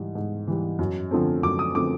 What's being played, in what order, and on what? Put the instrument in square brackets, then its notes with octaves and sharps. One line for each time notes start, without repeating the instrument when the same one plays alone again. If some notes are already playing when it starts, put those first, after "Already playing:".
Already playing: [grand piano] G#2 E3 G3
G#2
E3 G3
F#2
D3 F3 A3 C4
F#2 D6
D#6
D3 F3 A3 C4 D6